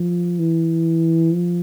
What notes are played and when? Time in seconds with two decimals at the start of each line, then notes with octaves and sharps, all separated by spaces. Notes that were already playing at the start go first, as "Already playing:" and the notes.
Already playing: F3
0.39 E3
1.32 F3